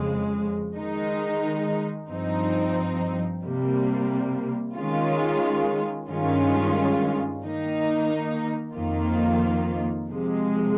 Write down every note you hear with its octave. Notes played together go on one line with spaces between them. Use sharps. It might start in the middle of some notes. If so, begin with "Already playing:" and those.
Already playing: F2 C#3 G#3
D#3 G#3 D#4
G2 F3 C4 D#4
C3 G3 A#3
D#3 G#3 C#4 F4
G2 D#3 G#3 C#4 F4
D#3 A#3 D#4
F2 D#3 A#3 F4
C3 F3 G#3